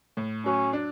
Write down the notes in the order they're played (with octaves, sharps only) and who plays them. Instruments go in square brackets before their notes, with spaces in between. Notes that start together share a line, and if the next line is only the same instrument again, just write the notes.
[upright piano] A2
[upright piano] F#3 [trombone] C#4
[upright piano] D4